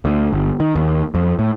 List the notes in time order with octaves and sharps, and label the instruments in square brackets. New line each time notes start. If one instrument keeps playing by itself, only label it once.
[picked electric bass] D2
G1
D#3
D#2
F2
A2